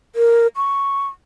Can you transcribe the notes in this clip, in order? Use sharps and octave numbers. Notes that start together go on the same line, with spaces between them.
A#4
C#6